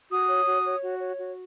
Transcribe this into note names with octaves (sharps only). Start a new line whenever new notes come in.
F#4 D#6
C#5
F#4
C#5
F#4
C#5
F#4